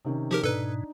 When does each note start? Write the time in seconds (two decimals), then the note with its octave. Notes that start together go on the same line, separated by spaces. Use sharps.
0.05 C3 D#3 C#4
0.31 F3 D#4 G4 G#4 A#4
0.44 G#2 B2 D4 D#4 A4 B4